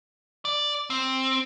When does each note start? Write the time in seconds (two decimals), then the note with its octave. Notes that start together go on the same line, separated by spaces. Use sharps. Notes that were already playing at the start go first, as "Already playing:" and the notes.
0.45 D5
0.90 C4